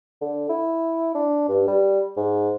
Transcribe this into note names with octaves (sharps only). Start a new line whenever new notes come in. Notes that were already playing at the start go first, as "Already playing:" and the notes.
D3
E4
D4
G2
G3
G#2